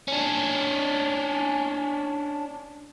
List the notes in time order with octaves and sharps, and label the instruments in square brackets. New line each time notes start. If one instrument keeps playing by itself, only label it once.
[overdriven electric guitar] C#4 D4